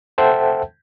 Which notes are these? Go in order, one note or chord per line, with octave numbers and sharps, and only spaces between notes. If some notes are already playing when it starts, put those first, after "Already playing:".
A4 C5 E5 F#5 G5 A5